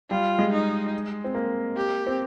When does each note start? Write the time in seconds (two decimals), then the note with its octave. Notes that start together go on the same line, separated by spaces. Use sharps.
0.10 G3 F4
0.39 G#3
0.52 D#4
1.24 C4
1.35 A#3
1.77 G4
2.07 C4